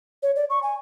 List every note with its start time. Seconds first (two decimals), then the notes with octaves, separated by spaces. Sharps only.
0.23 C#5
0.36 D5
0.50 C#6
0.63 G#5